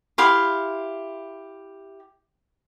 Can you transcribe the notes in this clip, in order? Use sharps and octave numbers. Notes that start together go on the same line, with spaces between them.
E4 G4 F5 C6